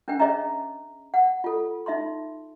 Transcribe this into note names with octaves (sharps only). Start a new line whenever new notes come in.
C#4 D4 B4 G5
G#4 C#5 D#5 E5 A#5
F#5
F4 A4
D#4 E5 B5 C6